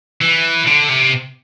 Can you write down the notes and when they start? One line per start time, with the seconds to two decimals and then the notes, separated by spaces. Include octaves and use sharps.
0.21 E3
0.66 D3
0.89 C3